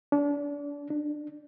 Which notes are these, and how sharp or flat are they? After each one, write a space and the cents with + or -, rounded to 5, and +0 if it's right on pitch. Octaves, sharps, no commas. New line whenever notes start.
D4 -30
D4 +25